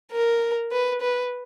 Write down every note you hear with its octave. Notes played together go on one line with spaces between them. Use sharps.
A#4
B4
B4